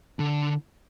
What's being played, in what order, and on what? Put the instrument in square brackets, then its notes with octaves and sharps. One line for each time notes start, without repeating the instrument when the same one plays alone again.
[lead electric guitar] D3